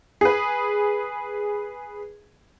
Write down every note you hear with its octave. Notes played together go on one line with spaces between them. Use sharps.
G#4 B4